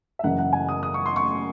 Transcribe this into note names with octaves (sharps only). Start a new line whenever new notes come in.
E5
F#1 F#2 E3 F#5
F#5
G#5
D#6
D#6
C#6
C6
C#6